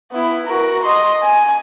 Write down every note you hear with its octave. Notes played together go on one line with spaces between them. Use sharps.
B3 E4
F#4 A#4
D#5 C6
G#5